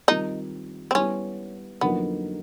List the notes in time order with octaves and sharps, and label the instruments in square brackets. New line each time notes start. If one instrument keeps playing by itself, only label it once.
[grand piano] D#3 G3 C4 F4 A#4 [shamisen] D#4
[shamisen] C4
[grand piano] G3 B3 E4 G4 [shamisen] C#4
[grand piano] F2 D3 F#3 A#3 D#4 [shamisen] B3